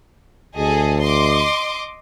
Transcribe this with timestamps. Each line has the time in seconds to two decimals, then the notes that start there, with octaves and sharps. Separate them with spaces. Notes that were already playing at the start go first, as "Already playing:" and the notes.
0.57 D2 G#4 A4 D#5
1.01 D#5 C6 D6